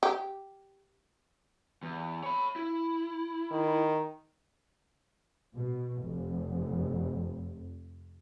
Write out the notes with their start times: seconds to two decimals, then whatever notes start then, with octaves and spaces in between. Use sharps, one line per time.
0.03 G4
1.83 E2
2.23 C#5 B5
2.56 E4
3.51 D#3
5.54 B2
6.04 F1